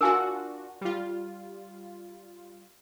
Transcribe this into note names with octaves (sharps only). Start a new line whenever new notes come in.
D4 F4 F#4 A#4 G#5
G3 F4